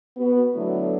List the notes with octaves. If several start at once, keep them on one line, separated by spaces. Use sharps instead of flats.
B3 F#4
D3 F#3 A3 B3 D4 E4